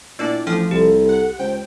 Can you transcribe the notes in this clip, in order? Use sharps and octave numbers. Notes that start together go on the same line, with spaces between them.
A#2 B3 D4 E4 D5
A1 F3 A4 G5 F6
C2 G4 A4
F#5
C#2 C5 G5